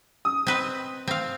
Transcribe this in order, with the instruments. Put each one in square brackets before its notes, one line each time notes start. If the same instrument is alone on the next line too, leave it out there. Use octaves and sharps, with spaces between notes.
[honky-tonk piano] D#6
[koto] C4 B4 D#5
C4 F5